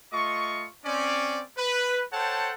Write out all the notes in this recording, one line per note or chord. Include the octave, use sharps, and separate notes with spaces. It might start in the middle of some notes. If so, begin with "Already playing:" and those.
A3 F4 D#5 C#6
C4 C#4 D5
B4
A4 C5 C#5 F#5 G5 A5